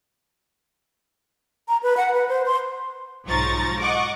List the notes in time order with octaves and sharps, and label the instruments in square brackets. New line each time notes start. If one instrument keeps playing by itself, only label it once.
[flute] A#5
B4
F#5
B4
C5
C6
[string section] B1 G#2 F3 A#5 C#6 A6
D#5 F#5 C#6 D6